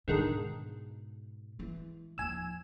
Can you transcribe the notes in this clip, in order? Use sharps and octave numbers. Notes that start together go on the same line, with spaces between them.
G#2 B2 D3 D#3 G#3
E3 G#3
D#2 F3 G#5 E6